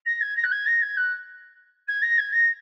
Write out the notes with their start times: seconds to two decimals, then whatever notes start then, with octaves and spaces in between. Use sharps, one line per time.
0.06 A#6
0.21 G#6
0.36 A#6
0.43 F#6
0.51 G#6
0.66 A#6
0.81 G#6
0.97 F#6
1.88 G#6
2.02 A#6
2.18 G#6
2.32 A#6